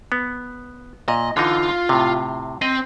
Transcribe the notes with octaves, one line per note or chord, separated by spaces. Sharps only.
B3
A#2 D#5
D3 E3 D#4 F4
A2 C3
C4 D#5